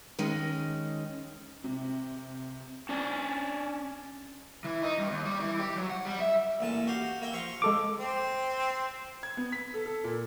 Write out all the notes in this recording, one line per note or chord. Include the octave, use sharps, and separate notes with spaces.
D#3 G#3 C#4 D#4
C3
C#4 D4 D5
E3
D#4
G2
D#2
G3
E3
G4
F#3
F#5
G3
E5
A1 A#2 A5
F#4 G4 F5
A#3 E5 G5
F3 F5 C#6
G#3 A4 D6
C4
G#6
B3
B6
A4
A4
A#2